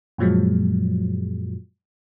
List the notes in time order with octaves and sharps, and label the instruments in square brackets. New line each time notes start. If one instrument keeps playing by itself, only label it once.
[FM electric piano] F#2 A#2 F3 F#3 G#3